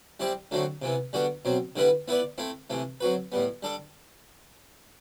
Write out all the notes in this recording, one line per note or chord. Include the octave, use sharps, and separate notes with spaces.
G3 C4 E4 G4 D5
D3 F#3 A3 C4 F#4
C3 E3 B3
D3 G3 B3 F#4
B2 F#3 C4
D3 G3 B3 E4 B4
B3 E4 B4 D5
A3 C4 E4
C3 E3 A3
F#3 C4 F#4 B4
A2 G3 B3
G3 D4 A4